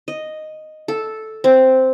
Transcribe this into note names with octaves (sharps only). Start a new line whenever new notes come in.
D#5
A4
C4